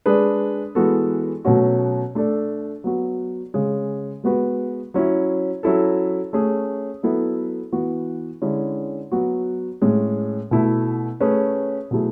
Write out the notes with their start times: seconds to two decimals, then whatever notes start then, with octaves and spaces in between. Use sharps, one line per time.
0.06 G#3 D4 G#4 B4
0.75 E3 G#3 B3 F#4 A4
1.45 B2 F#3 A3 C#4 F#4
2.15 A3 D4 A4
2.84 F#3 B3 F#4
3.54 C#3 G#3 C#4
4.23 G#3 B3 F#4 B4
4.94 F#3 C#4 E4
5.63 F#3 C#4 E4 A4
6.33 A3 C#4 G#4
7.03 F#3 B3 E4 A4
7.72 E3 B3 F#4
8.42 D3 G#3 C#4 E4
9.12 F#3 B3 F#4
9.82 A2 G#3 C#4
10.51 B2 A3 E4
11.20 A3 C#4 G#4 B4
11.91 B2 F#3 A3 E4 G#4